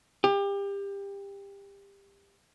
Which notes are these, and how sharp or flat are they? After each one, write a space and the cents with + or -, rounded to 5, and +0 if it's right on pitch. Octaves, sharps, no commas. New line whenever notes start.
G4 +25